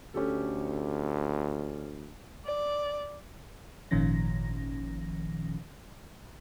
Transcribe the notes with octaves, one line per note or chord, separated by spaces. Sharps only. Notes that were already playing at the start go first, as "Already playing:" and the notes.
D2 C#4 G4 A4
D5
G#1 A#2 D#3 F3 C#4 A#6